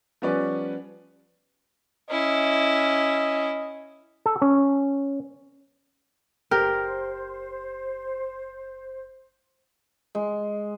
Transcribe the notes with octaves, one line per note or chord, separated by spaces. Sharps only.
F3 G3 B3 C#4 B4 D5
C#4 E4 D#5
A4
C#4
F#1 G4 A#4 C5
G#3